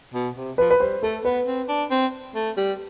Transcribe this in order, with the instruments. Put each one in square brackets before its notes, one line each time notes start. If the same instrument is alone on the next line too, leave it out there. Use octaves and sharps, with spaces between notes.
[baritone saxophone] B2
C3
[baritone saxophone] F3 [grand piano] B4
[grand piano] B4
[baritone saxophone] G3 [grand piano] C5
[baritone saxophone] A3 [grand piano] A4
[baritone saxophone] B3 [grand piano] B4
[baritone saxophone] C4
D4
C4
A3
G3